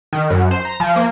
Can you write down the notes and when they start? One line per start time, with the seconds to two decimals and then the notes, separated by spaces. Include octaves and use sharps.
0.13 D#3
0.30 F#2
0.51 C5
0.65 A#5
0.80 F3
0.96 A#3